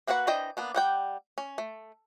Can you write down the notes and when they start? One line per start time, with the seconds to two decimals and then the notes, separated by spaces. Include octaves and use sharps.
0.07 A#3 F#4 B4 D#5 F#5
0.27 E3 D4 C5 D#5 G5
0.57 A#3 B3 D4
0.75 G3 F#5 G5
1.38 C#4
1.58 A3